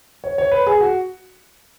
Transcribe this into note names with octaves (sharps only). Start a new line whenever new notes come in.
C#5
C#5
B4
G#4
F#4